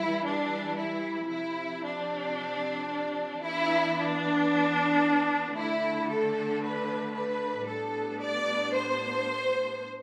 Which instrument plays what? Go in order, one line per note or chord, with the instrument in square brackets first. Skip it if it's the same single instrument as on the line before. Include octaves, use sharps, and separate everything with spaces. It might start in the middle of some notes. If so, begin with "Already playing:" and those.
Already playing: [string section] E3 G3 E4
D4
E4
C3 F3 C4 E4
D4
E3 B3 D4 E4
D4
D3 A3 D4 E4
A4
B4
B4
A2 G3 B3 D4 A4
D5
C5